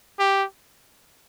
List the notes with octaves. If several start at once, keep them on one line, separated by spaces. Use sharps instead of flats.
G4